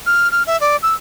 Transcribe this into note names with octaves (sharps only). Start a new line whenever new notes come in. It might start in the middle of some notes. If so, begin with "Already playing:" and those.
F6
F6
E5
D5
E6